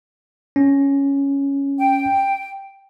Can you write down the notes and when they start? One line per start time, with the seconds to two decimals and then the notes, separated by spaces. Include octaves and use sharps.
0.56 C#4
1.78 G5